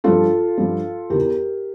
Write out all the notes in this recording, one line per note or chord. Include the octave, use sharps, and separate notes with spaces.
G2 F3 F4 A4
G2 F3
E2 E3 G4 A#4